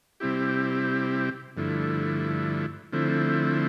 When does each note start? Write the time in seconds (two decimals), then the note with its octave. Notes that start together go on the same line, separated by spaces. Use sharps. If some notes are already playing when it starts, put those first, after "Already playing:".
0.20 C3 G3 C4 E4 G4
1.57 G2 D3 F3 A3 E4
2.92 D3 F3 A3 C4 E4